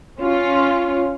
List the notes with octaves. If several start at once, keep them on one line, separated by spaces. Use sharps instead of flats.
C#4 F4